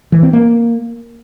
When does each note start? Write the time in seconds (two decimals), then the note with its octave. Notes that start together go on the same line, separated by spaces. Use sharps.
0.12 E3
0.23 C4
0.33 A#3